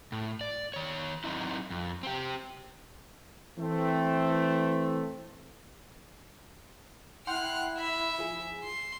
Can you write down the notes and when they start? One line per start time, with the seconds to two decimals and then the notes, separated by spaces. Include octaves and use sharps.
0.12 A2
0.41 D5
0.74 D#3 C#5
1.24 F#3 C4 D#4 E4
1.70 F2
2.03 C4 G4
3.58 E3 A3 C4
7.27 E4 F#5 G5 C6 F6 F#6
7.78 E5 B5
8.18 F3 G#4
8.63 C6